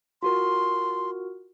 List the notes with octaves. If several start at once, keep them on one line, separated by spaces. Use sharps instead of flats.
F4 F#4 A#4 C6